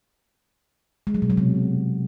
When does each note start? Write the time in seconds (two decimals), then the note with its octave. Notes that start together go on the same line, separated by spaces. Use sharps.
1.07 G#3
1.15 F#3
1.22 B2
1.30 F#3
1.37 C3